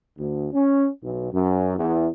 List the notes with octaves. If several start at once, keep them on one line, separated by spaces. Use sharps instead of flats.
D2
C#4
B1
F#2
E2